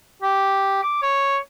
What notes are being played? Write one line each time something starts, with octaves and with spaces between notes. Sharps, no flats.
G4
D6
C#5